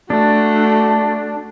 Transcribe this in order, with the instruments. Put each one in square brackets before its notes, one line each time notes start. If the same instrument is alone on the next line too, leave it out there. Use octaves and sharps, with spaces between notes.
[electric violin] A3 F#4 [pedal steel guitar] D4